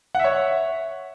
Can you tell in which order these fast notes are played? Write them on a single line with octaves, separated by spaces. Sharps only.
F#5 E5 C#5